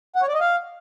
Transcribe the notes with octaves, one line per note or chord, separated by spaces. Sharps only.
F#5
C#5
D5
D#5
F5